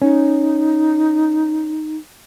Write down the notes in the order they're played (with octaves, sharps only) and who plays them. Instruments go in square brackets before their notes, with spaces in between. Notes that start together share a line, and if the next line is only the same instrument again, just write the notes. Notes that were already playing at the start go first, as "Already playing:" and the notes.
[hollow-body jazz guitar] C#4 [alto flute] D#4